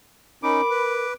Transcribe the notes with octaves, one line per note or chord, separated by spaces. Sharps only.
C#4 D#4 A#4 B5 D6
B4